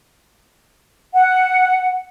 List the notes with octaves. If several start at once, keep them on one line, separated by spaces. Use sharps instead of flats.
F#5